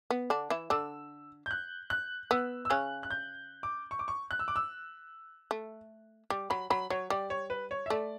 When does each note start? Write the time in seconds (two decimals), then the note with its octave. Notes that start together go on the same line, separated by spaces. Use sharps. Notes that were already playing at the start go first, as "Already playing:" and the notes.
0.10 B3
0.30 D3 D4
0.50 E3 E4
0.70 D3 D4 E6
1.46 G6
1.51 F#6
1.90 F#6
2.31 B3 E6
2.65 E6
2.70 C#3 C#4 F#6
3.03 F#6
3.10 G6
3.63 D6
3.91 C#6
3.99 D6
4.08 C#6
4.31 F#6
4.39 E6
4.48 D6
4.56 E6
5.51 A3
6.30 G3 D6
6.50 F#3 B5
6.70 F#3 B5
6.90 F#3 C#5
7.10 G3 D5
7.30 C#5
7.50 B4
7.71 C#5
7.86 E5
7.90 A3 D5